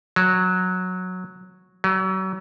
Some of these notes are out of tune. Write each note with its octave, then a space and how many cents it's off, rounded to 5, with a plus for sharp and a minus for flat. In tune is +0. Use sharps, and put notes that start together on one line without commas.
F#3 -10
F#3 +35